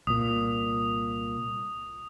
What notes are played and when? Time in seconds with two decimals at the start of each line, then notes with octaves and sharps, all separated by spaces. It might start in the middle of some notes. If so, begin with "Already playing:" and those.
0.07 C2 A#2 D#6